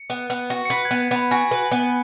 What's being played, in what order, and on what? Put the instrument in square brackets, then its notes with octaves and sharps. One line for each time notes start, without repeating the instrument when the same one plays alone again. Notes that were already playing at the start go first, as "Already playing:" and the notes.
Already playing: [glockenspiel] C#7
[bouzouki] B3
B3
F#4
[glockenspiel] C#7
[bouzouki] B4 [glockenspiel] B6
[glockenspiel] G#6
[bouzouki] B3
[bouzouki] B3 [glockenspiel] B5
[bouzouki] F#4 [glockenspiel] G#5
[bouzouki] B4
B3